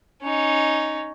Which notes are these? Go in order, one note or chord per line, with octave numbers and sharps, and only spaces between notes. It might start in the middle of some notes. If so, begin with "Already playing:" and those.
C#4 D#4